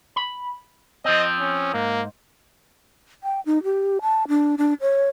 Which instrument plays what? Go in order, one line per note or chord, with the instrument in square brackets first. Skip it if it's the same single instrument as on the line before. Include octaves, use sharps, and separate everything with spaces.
[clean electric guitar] B5
[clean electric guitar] F3 C4 [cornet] D#5
[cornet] C#4
[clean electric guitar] G#2 [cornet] A#3
[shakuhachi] G5
D#4
G4
A5
D4
D4
C#5